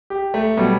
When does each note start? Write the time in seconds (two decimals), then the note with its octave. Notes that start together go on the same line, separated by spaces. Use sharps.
0.10 G4
0.34 A3
0.57 B2 F#3 G3